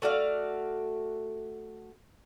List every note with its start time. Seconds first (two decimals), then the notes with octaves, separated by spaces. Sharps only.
0.02 A3 F#4 D5 F5